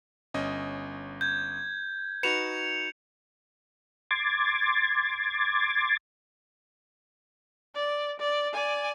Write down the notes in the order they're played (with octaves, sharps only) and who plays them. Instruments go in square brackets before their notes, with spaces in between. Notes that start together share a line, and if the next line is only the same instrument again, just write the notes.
[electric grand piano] G1 C#4 D#5
[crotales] G6 G#6
[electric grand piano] D#4 F#4 B4 [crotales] C#7 E7 F7
[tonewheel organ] C6 D6 G#6 A6
[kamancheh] D5
D5
D5 G#5